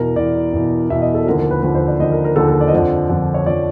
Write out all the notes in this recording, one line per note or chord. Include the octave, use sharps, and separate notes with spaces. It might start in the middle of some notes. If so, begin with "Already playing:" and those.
Already playing: E2 B2 A#4
E2 B2 D5
E2 B2
E2 B2 E5
D#5
A4
D#2 D3 F3 A#4
A#4
B4
D#2 D3 F3 B4
C5
D5
D#2 D3 F3 D#5
A#4
A#4
D#2 D3 F3 A4
A4
D5
D#5
F2 D3 F3 D5
F2 D3 F3
C#5
D3 F3 D5